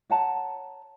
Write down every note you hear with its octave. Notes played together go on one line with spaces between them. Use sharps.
C#5 F#5 A5 A#5